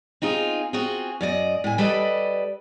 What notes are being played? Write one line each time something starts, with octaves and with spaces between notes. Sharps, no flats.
C4 D#4 F4 G#4
C4 F4 F#4 G#4
F#2 D5 D#5
A2 G#5
G3 A4 B4 D5 D#5